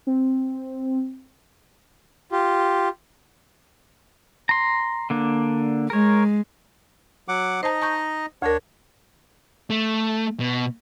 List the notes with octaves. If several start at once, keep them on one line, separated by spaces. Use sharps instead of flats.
C4
F4 G4
A#5 C6
D3 A#3 D4
G#3 A#4 C#5
F#3 F#5 D6
D#4 C5 D#5 A5
A5 C#6 G6
D2 D4 A#4 C#5
A3
B2